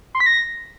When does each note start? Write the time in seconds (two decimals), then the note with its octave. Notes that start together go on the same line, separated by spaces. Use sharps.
0.15 C6
0.20 B6
0.26 A#6